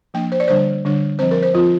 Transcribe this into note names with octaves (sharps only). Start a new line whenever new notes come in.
F3 A#3 D4 G5
C5
D5
D3 G3 D4 C5
D3 G3 D4
F3 C4 C5
A#4
C5
F3 C4 F4